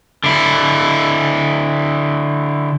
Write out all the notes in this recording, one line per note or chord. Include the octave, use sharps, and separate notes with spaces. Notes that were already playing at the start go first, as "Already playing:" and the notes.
D3 E4